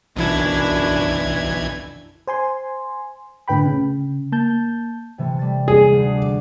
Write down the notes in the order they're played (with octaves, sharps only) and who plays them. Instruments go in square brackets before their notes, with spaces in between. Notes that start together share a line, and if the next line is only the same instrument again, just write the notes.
[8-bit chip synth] B1 E3 G#6 [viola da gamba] F#2 D4 E4
[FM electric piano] C5 G#5 C6
A2 D3 B4 G5 B5
C#3
A#3 A5 G6
[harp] C3 E3 A3
G3 A6
[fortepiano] G#4
[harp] D2 C7
D6